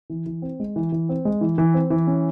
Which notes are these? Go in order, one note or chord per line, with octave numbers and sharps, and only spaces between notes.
E3
E3
C4
G#3
E3
E3
C4
G#3
E3
E3
C4
E3
C#4